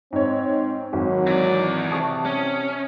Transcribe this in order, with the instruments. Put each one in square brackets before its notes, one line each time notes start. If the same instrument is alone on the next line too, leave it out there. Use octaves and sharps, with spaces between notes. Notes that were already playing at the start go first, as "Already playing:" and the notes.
[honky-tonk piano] G#2 C#5 [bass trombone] C4
[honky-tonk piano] G#1 [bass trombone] F#3
[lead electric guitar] E3 D5
[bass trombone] C3 [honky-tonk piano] A5 C#6 D#6
[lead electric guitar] C#4